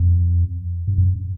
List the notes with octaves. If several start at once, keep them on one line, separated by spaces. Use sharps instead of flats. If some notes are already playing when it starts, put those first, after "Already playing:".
Already playing: F2
G2
F#2